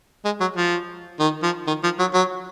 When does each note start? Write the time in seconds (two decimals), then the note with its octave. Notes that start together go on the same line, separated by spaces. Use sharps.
0.25 G#3
0.40 F#3
0.56 F3
1.20 D#3
1.43 F3
1.67 D#3
1.83 F3
1.99 F#3
2.14 F#3